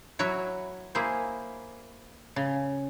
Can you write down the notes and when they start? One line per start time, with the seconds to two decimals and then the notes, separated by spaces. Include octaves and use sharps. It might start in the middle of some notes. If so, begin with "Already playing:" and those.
0.19 F#3 E4 F#4 C#5
0.95 A#3 E4 G#4 C5
2.36 C#3